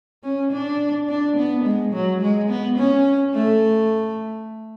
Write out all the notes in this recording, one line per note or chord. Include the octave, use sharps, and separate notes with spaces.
C#4
D4
D4
B3
G#3
F#3
G#3
B3
C#4
A3